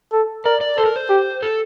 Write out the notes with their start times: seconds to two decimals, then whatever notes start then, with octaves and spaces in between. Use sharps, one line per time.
0.12 A4
0.45 A#4 D5
0.61 D5
0.78 A4 C5
0.86 A#4
0.96 C5
1.10 G4
1.42 A4